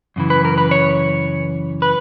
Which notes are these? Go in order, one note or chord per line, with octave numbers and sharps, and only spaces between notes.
F#2 C#3 E3
B4
A#4
B4
C#5
B4